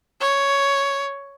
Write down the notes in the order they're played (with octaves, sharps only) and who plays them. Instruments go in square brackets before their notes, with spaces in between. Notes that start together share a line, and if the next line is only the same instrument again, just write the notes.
[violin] C#5